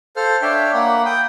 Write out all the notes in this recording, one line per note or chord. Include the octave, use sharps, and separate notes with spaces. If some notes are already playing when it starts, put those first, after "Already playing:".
A4 C5 F5 F6
D4 C#5 E5 F5 G5
A#3 F#5 B5
G5 D#6